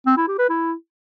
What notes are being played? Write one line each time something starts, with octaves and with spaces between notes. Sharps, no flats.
C4
E4
G4
B4
E4